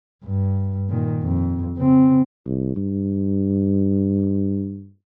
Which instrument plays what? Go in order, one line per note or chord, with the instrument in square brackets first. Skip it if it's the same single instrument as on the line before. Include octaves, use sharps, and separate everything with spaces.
[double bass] G2
A#2 D#3
F2
C#3 C4
[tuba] C2
G2